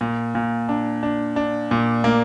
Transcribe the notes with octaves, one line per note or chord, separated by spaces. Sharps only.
A#2
A#2
D4
D4
D4
A#2
A#3